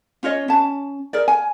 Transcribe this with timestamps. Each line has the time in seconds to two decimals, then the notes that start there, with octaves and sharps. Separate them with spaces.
0.23 C#4 F4 C#5 D#5
0.48 C#4 A5
1.13 G#4 A#4 D5
1.28 G#5